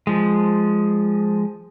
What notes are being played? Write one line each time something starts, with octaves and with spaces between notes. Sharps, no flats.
F3 G#3